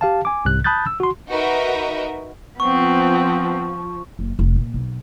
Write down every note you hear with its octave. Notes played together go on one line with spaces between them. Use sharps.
G4 F5 A5
G#5 D6
C2 G#2 C3 F#6
A5 B5 D#6 F#6 G6 A6
E6
F#4 C6
D#4 F#4 A#4 B4 D#5 E5
F3 B3 C4 C#6
F#1
F1
A#2
B1